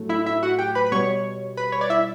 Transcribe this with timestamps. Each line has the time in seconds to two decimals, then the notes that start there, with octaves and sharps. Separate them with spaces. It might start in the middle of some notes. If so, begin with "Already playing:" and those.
Already playing: A2 F#3 A3
0.09 E4 E5
0.26 E4 E5
0.43 F#4 F#5
0.59 G4 G5
0.75 B4 B5
0.86 B5
0.92 B2 G3 C#5 C#6
1.57 B4 B5
1.72 C#5
1.81 D5
1.90 E4 E5